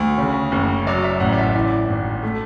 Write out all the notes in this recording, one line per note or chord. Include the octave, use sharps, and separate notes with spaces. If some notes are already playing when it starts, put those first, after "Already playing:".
Already playing: D2
C#3
F#1
F#3 D5
E5
A1 F#5
D5
E5
E3 D5
G#1
A3